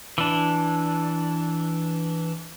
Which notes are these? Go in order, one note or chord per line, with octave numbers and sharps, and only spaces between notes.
E3 D4